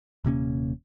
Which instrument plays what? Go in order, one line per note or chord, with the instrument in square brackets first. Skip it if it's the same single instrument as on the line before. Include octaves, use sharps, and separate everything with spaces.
[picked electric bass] D#1 C3 A#3 C#4